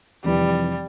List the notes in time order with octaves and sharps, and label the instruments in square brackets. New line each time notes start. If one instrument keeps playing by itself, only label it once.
[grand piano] F1 F2 E3 [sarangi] G3